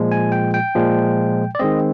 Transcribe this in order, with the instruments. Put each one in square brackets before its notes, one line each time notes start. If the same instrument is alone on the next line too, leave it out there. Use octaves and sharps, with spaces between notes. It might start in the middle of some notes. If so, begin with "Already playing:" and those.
Already playing: [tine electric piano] A#2 F3 G#3
G#5
G5
G5
A#2 F3 G#3
D5
D#3 G#3 C4 D#5